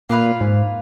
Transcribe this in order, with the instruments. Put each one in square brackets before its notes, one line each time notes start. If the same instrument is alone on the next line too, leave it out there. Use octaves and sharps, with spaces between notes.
[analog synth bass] A#2 [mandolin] A#3 F4 B4 F5
[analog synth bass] G#2